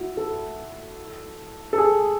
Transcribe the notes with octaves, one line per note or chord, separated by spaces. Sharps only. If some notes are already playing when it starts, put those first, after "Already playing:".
Already playing: E4 F#4
A4
A4
G#4